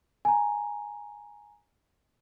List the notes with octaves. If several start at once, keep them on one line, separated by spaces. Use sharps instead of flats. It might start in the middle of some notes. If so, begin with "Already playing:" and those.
G#5 A#5